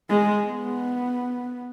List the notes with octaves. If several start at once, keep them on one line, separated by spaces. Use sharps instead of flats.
G#3
B3